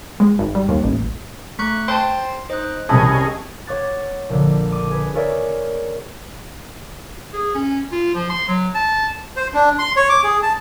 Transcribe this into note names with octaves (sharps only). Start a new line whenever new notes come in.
G#3
G#1
G3
D#2
A1
A3 C#6 F#6
C5 G5 A5
D#4 C5 F#6
C2 C3 C#4 E4 G#4 D#5 A5
C#5 F#5 D6 F#6 A6
A#1 D3
D6 D#7
G#4 B4
G#4 A#4 C#5 D5 E5
G#4
C#4
F4
F3
C6
F#3
A5
C5
D4
C6
C#5
D6
G#4
A5